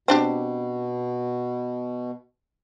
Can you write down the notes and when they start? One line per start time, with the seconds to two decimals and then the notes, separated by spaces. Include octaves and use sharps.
0.08 B2 C4 D4 G4